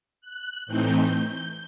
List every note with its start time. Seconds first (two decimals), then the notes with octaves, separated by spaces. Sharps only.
0.21 F#6
0.66 A2 E3 A3 C4 D#4 G6